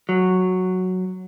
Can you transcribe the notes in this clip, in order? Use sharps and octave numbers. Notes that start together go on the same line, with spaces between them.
F#3